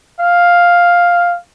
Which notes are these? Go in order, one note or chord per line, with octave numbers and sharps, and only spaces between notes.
F5